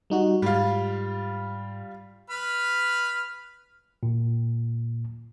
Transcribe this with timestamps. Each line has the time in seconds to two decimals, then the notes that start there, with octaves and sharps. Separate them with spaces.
0.10 G3 D#4 F#4
0.42 G#2 G3 F4
2.30 B4 B5 F6
4.03 A#2